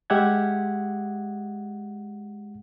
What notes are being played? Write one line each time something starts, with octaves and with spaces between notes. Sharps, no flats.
G#3 G4 E5 F#5 G#6